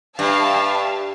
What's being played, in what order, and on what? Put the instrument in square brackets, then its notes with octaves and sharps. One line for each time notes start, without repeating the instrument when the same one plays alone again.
[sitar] G2 [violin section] E5 F5 A5